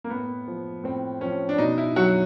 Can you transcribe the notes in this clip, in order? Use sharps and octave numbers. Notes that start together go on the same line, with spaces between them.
A#3
A2 B3
F3
A2 C4
F3 C#4
D4
B2 D#4
E4
F#3 F#4